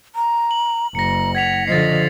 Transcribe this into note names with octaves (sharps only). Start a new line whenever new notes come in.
A#5
F#7
F#1 A#5 A#6 C#7
F#5 G#6 B6 F7
D3 F3 D#5 A6 C7